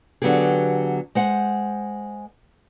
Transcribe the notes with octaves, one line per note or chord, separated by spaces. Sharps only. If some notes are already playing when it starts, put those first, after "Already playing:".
D3 F#3 B3 G4 G#4
G#3 C5 F#5